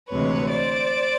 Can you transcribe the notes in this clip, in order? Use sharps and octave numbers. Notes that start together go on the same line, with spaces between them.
D2 C3 E3 G#3 B4 C#5
C5 D5